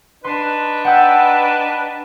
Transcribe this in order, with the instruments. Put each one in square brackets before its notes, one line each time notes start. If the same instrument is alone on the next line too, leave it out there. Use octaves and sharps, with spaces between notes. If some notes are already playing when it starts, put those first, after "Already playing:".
[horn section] D4 D#4 B4 [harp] C6
[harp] F#5 G5 E6